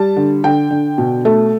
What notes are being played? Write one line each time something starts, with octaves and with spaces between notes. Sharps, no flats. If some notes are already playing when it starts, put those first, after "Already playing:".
Already playing: G3 A5
D3
D3 G5
D3
B2
A3